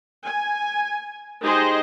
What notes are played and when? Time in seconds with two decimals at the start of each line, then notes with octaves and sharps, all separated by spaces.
0.24 G#5
1.41 G#3 D#4 G4 G#4 C5 D#5